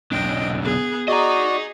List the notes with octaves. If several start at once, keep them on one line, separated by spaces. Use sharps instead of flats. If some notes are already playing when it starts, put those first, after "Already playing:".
B1 D3 D#5 G5
B3 G#4
F#4 G#4 D5 D#5 A#5